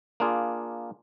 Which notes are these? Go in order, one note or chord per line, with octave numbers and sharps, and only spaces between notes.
A#3 D4 F4 G#4